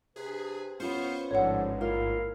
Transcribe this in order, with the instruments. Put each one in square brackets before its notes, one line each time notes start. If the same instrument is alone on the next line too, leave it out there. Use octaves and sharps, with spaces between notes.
[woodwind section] C3 D4 B4 [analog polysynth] G#4
[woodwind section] C2 B3 F5 [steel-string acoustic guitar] C#4 F4 B4 [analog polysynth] C5 C#6
[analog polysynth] A1 G#2 [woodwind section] D3 F3 [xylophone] C#5 F#5
[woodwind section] A#3 E4 F5 [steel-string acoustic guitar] F4